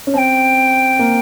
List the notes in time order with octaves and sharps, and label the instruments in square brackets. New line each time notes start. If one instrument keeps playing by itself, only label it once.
[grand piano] C#4
[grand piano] C4 [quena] A5
[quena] G5
[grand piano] A#3